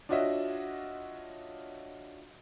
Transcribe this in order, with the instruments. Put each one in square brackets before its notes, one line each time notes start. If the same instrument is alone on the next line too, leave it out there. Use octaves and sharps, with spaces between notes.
[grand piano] D4 F4 F#4 C#5 D#5 E5